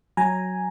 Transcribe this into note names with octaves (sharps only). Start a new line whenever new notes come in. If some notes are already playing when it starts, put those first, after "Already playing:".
F#3 G#5 A#5